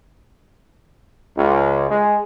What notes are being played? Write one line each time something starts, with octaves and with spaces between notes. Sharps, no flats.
C#2
G#3